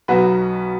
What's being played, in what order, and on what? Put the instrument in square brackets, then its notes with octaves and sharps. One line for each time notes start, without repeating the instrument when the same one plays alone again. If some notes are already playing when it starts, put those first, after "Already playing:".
[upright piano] B1 B2 F#3 F#4 B4